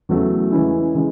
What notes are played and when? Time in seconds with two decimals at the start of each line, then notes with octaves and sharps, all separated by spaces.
0.09 E2 C#3 F#3 A3
0.52 C#3 E3 G#3 C#4 E4
0.95 C#3 E3 G#3